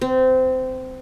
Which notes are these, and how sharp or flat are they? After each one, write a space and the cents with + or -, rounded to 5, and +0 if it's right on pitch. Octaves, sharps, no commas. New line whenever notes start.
C4 -20